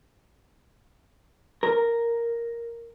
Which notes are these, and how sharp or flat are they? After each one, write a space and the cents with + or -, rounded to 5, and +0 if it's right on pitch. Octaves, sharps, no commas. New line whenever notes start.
A#4 +0